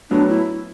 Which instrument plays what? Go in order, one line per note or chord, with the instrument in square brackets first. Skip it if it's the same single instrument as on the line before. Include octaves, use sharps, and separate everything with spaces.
[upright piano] A2 F#3 B3 [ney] D4
[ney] E4